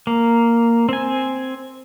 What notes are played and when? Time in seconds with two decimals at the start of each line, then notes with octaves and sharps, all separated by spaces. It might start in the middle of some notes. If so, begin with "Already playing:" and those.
0.07 A#3
0.89 C4 G#5